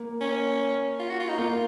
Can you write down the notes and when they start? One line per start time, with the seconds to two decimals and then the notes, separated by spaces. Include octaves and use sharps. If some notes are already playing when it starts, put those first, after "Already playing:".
Already playing: A#3
0.21 C#4
1.00 F4
1.09 F#4
1.20 F4
1.28 D#4
1.38 A#3 F4